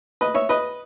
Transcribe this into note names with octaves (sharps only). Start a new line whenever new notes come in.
B4 D#5
C#5 E5
B4 D#5